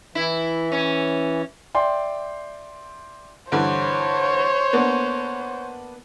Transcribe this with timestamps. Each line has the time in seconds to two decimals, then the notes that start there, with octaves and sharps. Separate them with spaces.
0.15 E3 E4
0.72 C#4
1.75 D5 E5 G5 C6
3.52 G2 D3 E3 C5 C#5
4.73 A#3 B3 D4